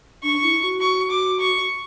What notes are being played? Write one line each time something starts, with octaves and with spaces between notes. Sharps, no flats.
D4 C#6
E4
F#4
C#6
D6
C#6